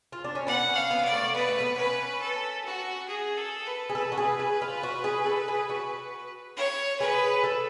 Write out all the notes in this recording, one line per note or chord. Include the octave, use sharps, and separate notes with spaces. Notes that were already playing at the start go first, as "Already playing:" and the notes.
F4
D4
C#4
B3 F#5
C#4
F5
B3
D5
A3
B3 B4
A3
B3
C#4 B4
A4
F#4
G#4
A4
B4
G#4
A4 B4
F#4
G#4
G#4
F4
F#4
G#4
A4
G#4
F#4
C#5
G#4 B4
A4